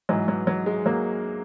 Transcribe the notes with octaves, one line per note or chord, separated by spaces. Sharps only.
G#2 E3 F#3
F#3
F#3
G#3
F#3 A#3